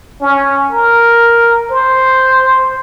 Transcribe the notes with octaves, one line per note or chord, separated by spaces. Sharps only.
C#4
A#4
C5